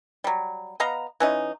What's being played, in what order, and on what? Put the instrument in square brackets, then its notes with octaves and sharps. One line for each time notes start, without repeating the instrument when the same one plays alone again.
[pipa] F#3 G3
B3 D#5 F5 A#5
E3 C#4 D#4